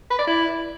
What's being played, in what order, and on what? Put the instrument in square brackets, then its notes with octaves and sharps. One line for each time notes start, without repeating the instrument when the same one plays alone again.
[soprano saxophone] B4
D5
E4